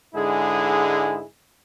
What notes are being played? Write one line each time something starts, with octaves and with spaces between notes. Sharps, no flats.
G#2 D3 G#3 E4 G#4